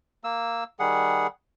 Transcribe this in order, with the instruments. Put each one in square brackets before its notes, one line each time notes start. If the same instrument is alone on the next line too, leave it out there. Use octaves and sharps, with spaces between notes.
[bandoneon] A#3 E6
D#3 G3 G#4 F#5